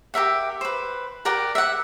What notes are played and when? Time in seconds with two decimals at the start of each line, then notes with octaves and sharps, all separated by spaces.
0.14 G4 A#4 E5 F#5
0.61 B4 C5
1.25 G4 A#4 D5 F#5
1.55 E5 F#5